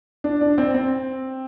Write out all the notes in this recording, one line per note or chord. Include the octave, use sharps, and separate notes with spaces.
D4
D4
C4
C4